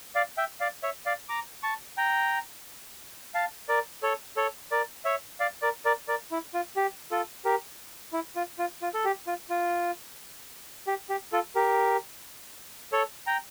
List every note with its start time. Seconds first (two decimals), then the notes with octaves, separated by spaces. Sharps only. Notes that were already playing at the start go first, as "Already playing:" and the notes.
0.15 D5 F5
0.38 E5 G5
0.60 D5 F5
0.83 C#5 E5
1.06 D5 F5
1.29 A#5 D6
1.63 A5 C#6
1.97 G5 A#5
3.34 F5 A5
3.69 A#4 D5
4.03 A4 C#5
4.37 A4 C#5
4.71 A#4 D5
5.05 C#5 E5
5.40 D5 F5
5.62 A#4 D5
5.85 A#4 D5
6.08 A#4 D5
6.31 E4
6.54 F4
6.76 G4
7.11 F4 A4
7.45 G4 A#4
8.13 E4
8.36 F4
8.59 F4
8.82 F4
8.94 A4
9.05 G4
9.27 F4
9.50 F4
10.87 G4
11.09 G4
11.32 F4 A4
11.55 G4 A#4
12.92 A4 C#5
13.27 G5 A#5